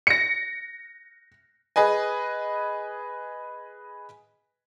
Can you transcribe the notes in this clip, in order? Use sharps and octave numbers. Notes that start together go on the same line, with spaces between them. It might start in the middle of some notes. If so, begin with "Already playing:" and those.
A#6 C#7
G#4 B4 D#5 G#5